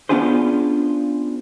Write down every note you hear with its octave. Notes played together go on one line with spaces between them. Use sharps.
B3 C#4 D4 F4 G#4 C5